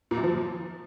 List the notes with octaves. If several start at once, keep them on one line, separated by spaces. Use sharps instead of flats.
A#2
F#2
F3